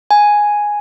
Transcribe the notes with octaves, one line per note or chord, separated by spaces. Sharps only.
G#5